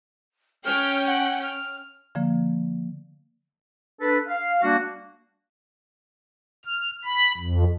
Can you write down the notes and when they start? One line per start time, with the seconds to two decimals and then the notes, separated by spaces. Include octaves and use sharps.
0.65 C#4 G5 F6
1.07 F#5
1.42 F6
2.15 D3 F3 A#3
4.01 D4 A4 B4
4.27 F5
4.62 G3 A#3 D4 F#4
6.65 F6
7.05 B5
7.37 F2